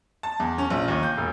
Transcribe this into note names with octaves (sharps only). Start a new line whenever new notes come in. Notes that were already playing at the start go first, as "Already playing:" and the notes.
A5
E2
C#4
A#1
D#2
G6
E1